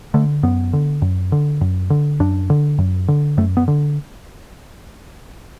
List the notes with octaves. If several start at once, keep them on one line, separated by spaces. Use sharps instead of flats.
D3 A3
F#2 B3
D3
F#2
D3
F#2
D3
F#2 D4
D3
F#2
D3
F#2 A3
B3
D3